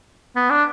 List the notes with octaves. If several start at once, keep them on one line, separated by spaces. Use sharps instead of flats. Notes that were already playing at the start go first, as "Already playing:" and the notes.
B3
D4